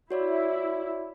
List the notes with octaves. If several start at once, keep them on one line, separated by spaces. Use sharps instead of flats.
E4 F#4 C#5 D5